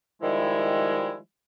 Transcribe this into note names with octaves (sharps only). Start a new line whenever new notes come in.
D#3 F3 G3 G#3 E4